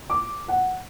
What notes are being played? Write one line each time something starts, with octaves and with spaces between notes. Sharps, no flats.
D6
F#5